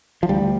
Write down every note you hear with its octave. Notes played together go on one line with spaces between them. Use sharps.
F3
D2 G3